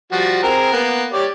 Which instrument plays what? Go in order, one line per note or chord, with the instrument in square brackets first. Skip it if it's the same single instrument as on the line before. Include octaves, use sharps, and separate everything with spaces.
[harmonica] F3 G3 F#4
C4 G#4 A#4
A#3 B3
G4 C#5 D5